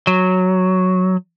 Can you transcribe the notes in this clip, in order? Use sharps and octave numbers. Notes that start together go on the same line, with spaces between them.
F#3